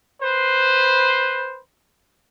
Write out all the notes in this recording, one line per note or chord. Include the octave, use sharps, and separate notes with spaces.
B4 C5